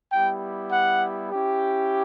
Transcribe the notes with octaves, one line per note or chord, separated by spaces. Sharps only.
G3 B3 E4 G4 G5
F#5
C#4 E4 G4